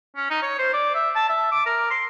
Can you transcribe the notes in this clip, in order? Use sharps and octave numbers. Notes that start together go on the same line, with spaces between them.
C#4
D#4
C#5
C5
D5
E5
A5
E5
D6
A#4
C6